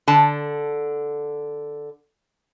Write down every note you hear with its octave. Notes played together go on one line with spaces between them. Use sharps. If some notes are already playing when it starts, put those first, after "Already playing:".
D3 A5